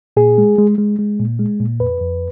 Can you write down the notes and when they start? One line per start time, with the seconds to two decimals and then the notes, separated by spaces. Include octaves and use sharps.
0.17 A#2 G#4
0.38 G#3
0.58 G#3
0.78 G#3
0.99 G#3
1.19 A#2
1.39 G#3
1.60 A#2
1.80 F2 B4
2.01 F2